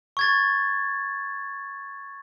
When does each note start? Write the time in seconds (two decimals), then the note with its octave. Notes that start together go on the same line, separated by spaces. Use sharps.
0.17 C#6 G#6 A6